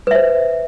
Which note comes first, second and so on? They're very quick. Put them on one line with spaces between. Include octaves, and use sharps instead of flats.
B4 E5 C5